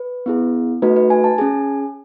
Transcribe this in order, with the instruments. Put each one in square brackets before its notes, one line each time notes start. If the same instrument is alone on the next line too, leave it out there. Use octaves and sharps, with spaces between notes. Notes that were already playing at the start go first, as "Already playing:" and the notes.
Already playing: [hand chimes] B4
B3 E4 G#4
A3 D#4 F#4 B4
B4
G#5
A5
C#4 G#4 G#5